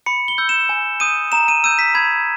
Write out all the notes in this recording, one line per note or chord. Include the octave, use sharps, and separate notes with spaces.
B5 C#7
G7
E6 G6
E7
G#5
D#6 G6 D#7
A#5 E7
D#7
E6 G6 D#7
B6
B5 G#6